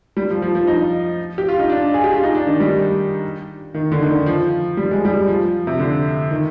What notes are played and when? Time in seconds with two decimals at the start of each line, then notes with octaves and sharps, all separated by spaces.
0.17 G3
0.30 F3
0.42 F3
0.55 F3
0.67 D#4
1.38 G4
1.49 F4
1.59 D#4
1.69 D4
1.94 G#4
2.04 G4
2.14 F4
2.24 D#4
2.35 D4
2.47 D#3
2.60 G3
3.74 D#3
3.92 D3
4.02 D#3
4.09 D3
4.26 F3
4.77 G3
4.91 G#3
5.05 G3
5.28 F3
5.67 C3
5.79 D3
6.31 D#3